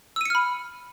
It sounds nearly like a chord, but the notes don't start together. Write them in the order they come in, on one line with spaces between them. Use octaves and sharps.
E6 D#7 C#7 F6 B5